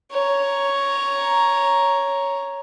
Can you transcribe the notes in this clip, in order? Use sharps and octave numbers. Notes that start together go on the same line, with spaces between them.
C#5 A#5